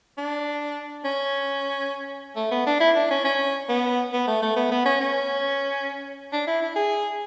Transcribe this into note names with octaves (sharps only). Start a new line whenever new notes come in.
D4
C#4
A3
B3
D4
E4
D4
C#4
C#4
B3
B3
A3
A3
B3
B3
C#4
C#4
D4
E4
E4
G#4